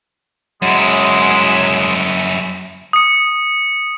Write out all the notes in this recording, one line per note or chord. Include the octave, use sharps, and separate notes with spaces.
F#2 F#3 G#3 E4
D#6 C#7